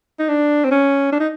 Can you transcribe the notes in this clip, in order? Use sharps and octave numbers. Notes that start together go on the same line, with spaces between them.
D#4
D4
C4
C#4
D4
D#4